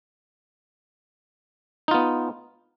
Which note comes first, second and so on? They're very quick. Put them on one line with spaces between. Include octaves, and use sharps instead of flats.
D#4 F4 B3